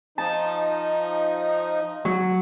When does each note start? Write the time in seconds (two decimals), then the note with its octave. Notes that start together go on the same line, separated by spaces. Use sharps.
0.18 F3 D#4 A5
2.05 F#3